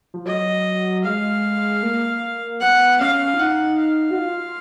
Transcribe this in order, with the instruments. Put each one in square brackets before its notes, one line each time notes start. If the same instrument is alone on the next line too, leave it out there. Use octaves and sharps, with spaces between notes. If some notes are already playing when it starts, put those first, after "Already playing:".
[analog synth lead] F3
[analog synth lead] F#3 [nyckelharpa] D#5
[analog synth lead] G#3 [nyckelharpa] F5
[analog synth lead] A#3
[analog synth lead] B3 [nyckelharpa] F#5
[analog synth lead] C#4 [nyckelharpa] F5
[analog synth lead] F4
[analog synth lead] D#4 [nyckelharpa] F#5
[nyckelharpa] F5
[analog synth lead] F#4
F4